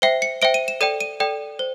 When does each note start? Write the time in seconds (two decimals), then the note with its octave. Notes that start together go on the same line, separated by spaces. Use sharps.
0.02 C5 E5 G5 C7
0.22 C#7
0.42 C5 E5 G5 D7
0.54 D#7
0.68 E7
0.81 A4 D5 G5 D#7
1.01 D#7
1.20 A4 D5 G5
1.59 C5